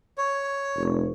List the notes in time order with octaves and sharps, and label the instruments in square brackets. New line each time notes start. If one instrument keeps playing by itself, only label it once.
[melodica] C#5
[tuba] F1